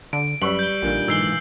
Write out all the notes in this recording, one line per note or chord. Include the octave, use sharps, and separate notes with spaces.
D3 D7
F#2 G3 B4 C#6 E6 F#7
G6 G7
A#1 A#2 D3 D#3
B1 G#2 E3 E6 C7 G7